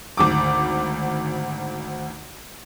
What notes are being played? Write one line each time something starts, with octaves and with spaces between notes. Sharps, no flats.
G#1 D2 D6